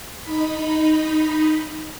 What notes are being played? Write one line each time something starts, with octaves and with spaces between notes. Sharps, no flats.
D#4 B5